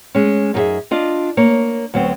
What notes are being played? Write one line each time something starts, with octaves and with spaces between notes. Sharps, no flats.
G#3 C#4
F#2 D#4 E4 G4 G#4 E5
D4 F4 D#5
A#3 C#5
D2 F#3 B3 C4